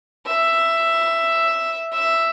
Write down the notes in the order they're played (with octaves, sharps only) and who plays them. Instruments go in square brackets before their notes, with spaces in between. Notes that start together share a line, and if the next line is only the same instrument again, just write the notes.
[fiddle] E5
E5